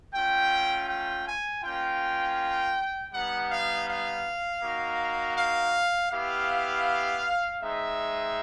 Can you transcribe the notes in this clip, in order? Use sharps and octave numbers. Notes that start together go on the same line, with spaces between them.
A3 C#4 F4 G5
G5
G#5
A#3 C#4 F4 G5
G3 B3 D#4 F#5
F5
F5
A#3 D#4 F#4
F5
B3 E4 G4 F5
G#3 C4 D#4 E5